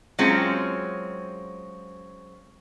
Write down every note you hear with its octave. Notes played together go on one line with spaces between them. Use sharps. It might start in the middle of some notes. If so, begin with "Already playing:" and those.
F#3 G#3 C4 C#4 F4